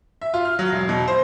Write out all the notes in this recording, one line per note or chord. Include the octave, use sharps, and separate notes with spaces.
E5
F4
F6
F#3
E1
B2
C5